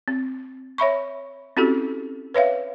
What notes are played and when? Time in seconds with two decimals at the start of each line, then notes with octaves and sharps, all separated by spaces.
0.08 C4
0.78 C#5 E5 B5 C#6
1.57 C4 C#4 E4 F#4 G4 A4
2.34 B4 C#5 E5 F5